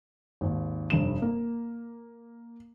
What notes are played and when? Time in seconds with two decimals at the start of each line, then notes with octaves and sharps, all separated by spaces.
0.41 G#1 D#2
0.90 F1 G2 E7
1.22 A#3